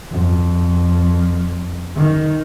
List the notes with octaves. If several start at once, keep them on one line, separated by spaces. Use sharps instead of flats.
F2
D#3